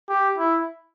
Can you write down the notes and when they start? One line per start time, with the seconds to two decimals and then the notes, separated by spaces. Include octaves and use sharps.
0.09 G4
0.38 E4